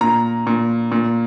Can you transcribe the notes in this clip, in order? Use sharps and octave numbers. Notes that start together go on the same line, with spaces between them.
A#2 A#5
A#2
A#2